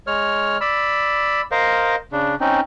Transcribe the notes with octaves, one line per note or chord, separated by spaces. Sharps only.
G#3 C#5 F6
D5 B5 E6
A#4 C5 D#5 F5
C#3 D4
C4 C#4 D#4